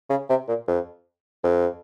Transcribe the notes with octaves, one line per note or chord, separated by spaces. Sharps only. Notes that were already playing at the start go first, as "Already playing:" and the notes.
C#3
C3
A#2
F2
F2